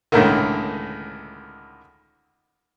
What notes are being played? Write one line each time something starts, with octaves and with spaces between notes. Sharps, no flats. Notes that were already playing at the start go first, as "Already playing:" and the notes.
C#2 A2 D3 D#3